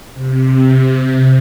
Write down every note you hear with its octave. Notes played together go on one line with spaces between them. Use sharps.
C3